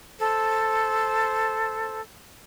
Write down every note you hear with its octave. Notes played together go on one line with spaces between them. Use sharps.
A4 C5